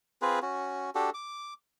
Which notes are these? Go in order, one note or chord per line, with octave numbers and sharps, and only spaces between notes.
C4 F4 G#4 B4
C#4 F#4
D4 F#4 G4 A4
D6